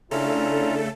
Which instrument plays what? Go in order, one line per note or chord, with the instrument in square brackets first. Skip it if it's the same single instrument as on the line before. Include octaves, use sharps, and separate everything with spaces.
[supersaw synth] C#3 A3 A4 [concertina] C#4 F4 A#5 [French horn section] D4 E4